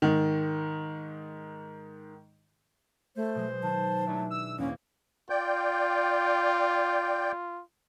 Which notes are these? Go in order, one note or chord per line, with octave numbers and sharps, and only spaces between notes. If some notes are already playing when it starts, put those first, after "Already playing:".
G#2 D#3
A3 C5
B2 F#3 G#3
D#3 A5
F#3 G#3 A3 D4 E4
E6
E2 A2 A#3 C4 C#4 G#6
F4 D5 G5 G6